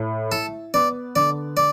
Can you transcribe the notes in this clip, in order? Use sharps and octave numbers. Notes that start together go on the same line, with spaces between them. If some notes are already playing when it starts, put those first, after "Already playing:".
Already playing: A2 A3
E4 A4
B3 D5
D3 D5
D5